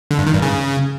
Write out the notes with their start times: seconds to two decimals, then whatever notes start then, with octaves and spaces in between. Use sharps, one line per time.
0.11 D3
0.19 G2
0.27 D#3
0.34 G2
0.42 C#3